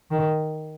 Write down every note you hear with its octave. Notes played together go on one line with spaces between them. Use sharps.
D#3